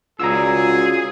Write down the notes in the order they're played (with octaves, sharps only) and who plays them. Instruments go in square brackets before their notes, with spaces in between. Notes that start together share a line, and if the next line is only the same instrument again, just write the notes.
[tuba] C#2 [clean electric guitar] F4 F#4 D5 [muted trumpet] G#4 [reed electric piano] A#5 E6